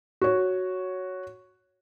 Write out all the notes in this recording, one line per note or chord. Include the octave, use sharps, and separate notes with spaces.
F#4 C#5